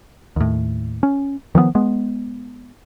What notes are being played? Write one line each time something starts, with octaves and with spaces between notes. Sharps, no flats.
D#2 A2
C#4
D#3 F3 G#3 B3
G#3 B3